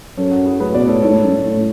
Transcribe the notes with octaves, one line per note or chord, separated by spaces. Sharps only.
F#2 A4 C#5
F#4
E4 G#4
A2 G#4 B4
B2 B4 D5
A2 A4 C#5
G#2 A4 C#5
A2
F#2
A2
A2